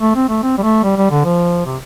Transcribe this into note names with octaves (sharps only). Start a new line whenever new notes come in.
A3
C4
A3
C4
G3
A3
G3
G3
D3
F3
C3